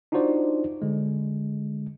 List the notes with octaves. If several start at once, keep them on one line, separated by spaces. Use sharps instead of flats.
D4 D#4 F4 F#4 C5 D5
D3 G#3